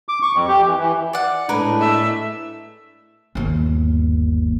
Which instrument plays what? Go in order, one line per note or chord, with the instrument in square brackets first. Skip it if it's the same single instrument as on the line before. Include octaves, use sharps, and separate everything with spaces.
[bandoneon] D6
C#6
F2
G4
E3
E3
[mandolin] D5 F#5
[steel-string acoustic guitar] A2 G#3 [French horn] D4 [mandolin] A#4 B4
[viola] A3 E5
[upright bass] G1 D#2